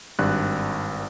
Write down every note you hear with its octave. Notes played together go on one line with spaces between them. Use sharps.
G#1 G2 F#6